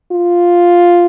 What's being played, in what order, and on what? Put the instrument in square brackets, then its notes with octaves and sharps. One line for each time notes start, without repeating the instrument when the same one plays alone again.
[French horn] F4